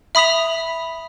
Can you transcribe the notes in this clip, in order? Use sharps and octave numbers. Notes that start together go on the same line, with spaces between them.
E5 B5 D#6 B6 F7